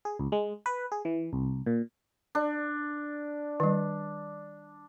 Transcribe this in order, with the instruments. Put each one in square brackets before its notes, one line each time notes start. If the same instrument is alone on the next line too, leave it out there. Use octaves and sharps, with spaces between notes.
[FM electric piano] G#4
C#2
G#3
B4
G#4
E3
C2
A#2
[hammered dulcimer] D4
[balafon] D#3 G3